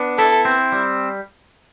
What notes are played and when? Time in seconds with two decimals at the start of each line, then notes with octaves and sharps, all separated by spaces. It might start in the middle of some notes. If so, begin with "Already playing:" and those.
Already playing: B3 D4
0.18 E4 A4
0.45 C4
0.72 G3